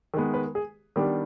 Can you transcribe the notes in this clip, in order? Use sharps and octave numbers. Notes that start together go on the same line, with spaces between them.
D#3 G#3 B3
B4
G#4
D#3 G3 B3 D4 G4